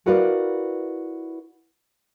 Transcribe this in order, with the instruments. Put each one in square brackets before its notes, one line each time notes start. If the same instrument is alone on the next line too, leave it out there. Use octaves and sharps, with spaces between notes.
[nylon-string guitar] E4 F#4 A#4 B4 D5 F5